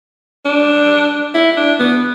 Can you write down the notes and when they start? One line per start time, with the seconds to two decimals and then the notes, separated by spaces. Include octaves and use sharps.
0.45 D4
1.34 E4
1.57 D4
1.79 B3